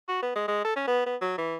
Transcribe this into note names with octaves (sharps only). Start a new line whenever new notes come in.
F#4
B3
G#3
G#3
A4
C#4
B3
B3
F#3
E3